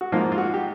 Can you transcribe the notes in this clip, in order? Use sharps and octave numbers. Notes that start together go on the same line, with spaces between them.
F#4
G#2 F3 A#3 F4
F4
F#4
G4